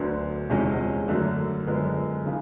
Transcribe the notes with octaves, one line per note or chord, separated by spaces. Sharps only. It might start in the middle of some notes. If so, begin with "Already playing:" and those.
Already playing: D2 D3 F#3 B3 D4
E2 C3 F3 G#3 C#4
F#2 D3 F#3 A3 D4
F#2 D3 F3 G#3 B3
C#3 E3